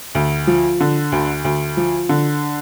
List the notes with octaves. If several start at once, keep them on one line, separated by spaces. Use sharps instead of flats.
D2
F3
D3
D2
D2
F3
D3